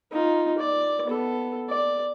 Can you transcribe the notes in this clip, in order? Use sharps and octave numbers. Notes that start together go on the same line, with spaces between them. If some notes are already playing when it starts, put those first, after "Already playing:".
D#4 F4
D5
B3 A4
D5